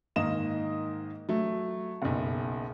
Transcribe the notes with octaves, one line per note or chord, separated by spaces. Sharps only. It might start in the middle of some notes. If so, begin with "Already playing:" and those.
G#2 D#3 A#3 D#5 E7
F#3 A3
F#1 B1